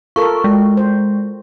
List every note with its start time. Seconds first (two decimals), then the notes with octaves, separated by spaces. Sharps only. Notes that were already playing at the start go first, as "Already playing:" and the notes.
0.16 F4 A4 A#4 C#6
0.44 G#3
0.77 C5